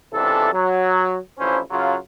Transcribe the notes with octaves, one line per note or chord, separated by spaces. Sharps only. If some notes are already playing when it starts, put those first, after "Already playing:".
C#2 C3 E3 D4 A4
F#3
A1 F3 C#4 D4 E4 C5
F#2 C#3 F#3 F4